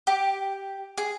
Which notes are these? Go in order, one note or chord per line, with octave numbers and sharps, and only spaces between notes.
G4
G#4